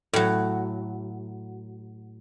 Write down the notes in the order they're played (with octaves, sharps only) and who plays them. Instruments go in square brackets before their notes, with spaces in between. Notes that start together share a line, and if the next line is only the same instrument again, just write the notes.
[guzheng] A2 F#3